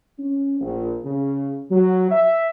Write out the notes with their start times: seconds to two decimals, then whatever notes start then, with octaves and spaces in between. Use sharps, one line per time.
0.19 C#4
0.60 A#1
1.05 C#3
1.71 F#3
2.11 E5